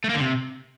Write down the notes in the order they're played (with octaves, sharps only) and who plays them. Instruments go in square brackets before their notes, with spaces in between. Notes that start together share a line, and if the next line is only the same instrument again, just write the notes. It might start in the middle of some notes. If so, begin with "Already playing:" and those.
[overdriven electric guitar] A3
A#3
D3
C3